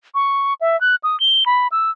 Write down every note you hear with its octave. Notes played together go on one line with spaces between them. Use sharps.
C#6
E5
F#6
D#6
G7
B5
E6